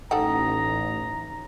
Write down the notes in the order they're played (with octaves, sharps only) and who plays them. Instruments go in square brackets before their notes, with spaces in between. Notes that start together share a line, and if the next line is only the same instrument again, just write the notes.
[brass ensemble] A1 [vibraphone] D#4 [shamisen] A4 F#5 G5 [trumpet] A#5